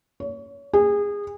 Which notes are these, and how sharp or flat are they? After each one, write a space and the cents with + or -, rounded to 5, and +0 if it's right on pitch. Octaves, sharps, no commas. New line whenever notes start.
C#5 +30
G#4 -25